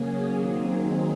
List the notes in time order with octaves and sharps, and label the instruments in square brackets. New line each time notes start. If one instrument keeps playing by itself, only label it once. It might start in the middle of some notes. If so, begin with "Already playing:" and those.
Already playing: [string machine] C#3 F#3 C#4 G#4 [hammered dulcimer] A#3
[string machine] D#3 F#3 C4 D#4 G#4